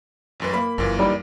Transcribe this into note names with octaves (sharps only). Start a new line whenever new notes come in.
A1 F#2 B4
A#3 B5
G1 F#2 A#2 E3
G3 D#4 B5